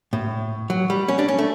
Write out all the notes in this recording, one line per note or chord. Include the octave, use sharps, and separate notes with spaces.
A2
F#3
G3
C#4
D4
C#4
A3